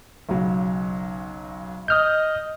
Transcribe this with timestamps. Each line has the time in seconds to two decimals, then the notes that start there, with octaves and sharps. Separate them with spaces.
0.29 B1 C#3 F#3
1.88 D#5 D#6 F6 G6